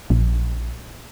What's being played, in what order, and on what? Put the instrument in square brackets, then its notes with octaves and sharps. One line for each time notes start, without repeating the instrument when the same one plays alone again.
[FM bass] A#1